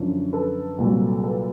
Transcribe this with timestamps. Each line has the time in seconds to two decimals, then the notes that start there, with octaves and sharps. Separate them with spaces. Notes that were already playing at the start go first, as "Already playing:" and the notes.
Already playing: F#2 D3 F3
0.33 A4 B4
0.78 C2 A#2 F#3
1.23 A4 B4